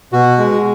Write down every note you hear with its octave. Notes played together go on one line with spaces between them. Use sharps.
B2 F#4
G#3